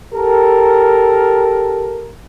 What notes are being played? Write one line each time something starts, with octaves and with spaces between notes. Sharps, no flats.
G4 A4 A#4